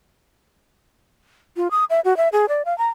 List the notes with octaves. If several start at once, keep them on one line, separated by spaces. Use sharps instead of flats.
F4
D#6
E5
F#4
E5
G#4
D5
F5
A#5